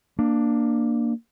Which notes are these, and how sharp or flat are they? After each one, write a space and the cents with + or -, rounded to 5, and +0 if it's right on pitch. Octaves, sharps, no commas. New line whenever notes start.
A#3 +0 D4 +10